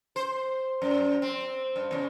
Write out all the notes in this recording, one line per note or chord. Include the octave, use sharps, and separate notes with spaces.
C5
F#2
C4
G2
E2 C#3